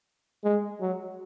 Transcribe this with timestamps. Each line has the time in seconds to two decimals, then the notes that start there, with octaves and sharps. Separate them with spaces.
0.44 G#3
0.81 F#3